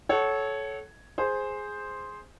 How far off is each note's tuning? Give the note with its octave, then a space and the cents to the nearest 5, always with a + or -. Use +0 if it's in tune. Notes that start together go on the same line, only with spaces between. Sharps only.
A4 -20 C#5 +0 F#5 +20
G#4 +0 C5 +0